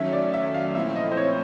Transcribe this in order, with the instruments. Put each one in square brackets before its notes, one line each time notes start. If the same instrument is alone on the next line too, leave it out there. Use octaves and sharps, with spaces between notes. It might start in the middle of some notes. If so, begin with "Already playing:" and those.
Already playing: [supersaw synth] D#3 F#3 A3 C#4 [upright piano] E5
[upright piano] D5
E5
F5
[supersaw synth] A#2 F3 A3 C4 E4 [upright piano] E5
[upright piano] D#5
C5
C#5